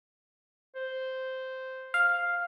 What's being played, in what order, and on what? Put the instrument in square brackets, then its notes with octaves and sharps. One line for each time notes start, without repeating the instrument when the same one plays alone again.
[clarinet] C5
[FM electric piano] F5